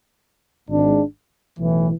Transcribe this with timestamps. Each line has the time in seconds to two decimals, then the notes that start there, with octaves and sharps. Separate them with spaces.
0.69 G#1 G#2 G#3 D4
1.58 B1 A2 E3